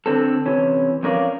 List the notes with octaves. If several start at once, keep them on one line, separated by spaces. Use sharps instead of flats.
D3 C4 A4
C3 E3 C#4
F2 C#4 A#4 D5 F5